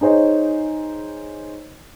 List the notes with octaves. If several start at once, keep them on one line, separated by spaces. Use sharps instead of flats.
D#4 G#4 C5 C#5 D#5